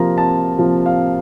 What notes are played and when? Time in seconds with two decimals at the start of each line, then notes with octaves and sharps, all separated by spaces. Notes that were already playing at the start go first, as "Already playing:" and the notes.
Already playing: C3 F3 A#3 F4 A#5
0.18 A5
0.58 C3 F3 A#3 F4
0.86 F5